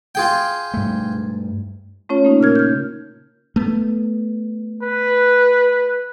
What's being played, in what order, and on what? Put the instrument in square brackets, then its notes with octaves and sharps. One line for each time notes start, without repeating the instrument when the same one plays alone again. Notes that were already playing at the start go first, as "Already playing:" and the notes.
[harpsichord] F4 G#4 G5
[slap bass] G2 A3
[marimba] A3 C#4 F4 C#5
A#3 D#4
A#2 C#3 A#4 F6 G#6
F6 G6
[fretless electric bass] A3 B3
[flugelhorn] B4